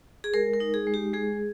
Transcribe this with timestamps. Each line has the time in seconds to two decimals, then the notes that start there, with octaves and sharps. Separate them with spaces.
0.24 G#4
0.34 G#3 A#4
0.54 A#4
0.60 D#4
0.74 G#4
0.87 G#3
0.94 G4
1.13 G#3 G#4